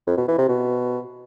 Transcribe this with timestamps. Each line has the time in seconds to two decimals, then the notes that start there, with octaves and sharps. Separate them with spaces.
0.07 F2
0.18 B2
0.28 E3
0.38 C3
0.49 B2